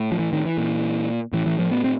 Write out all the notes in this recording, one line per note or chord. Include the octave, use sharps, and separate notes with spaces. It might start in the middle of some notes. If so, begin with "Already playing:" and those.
Already playing: A2
F3
E3
D#3
E3
A#2
A2 E3
E3
F3
B3
C4